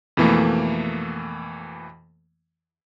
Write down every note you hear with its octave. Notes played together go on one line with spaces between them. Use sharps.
F2 B2 E3 A3 A#3